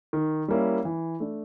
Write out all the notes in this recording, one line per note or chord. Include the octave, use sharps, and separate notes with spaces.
D#3
G3 A#3 C#4 E4
E3
A3 D4